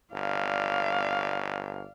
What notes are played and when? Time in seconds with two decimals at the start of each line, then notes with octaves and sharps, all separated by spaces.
0.13 G1 D5 F5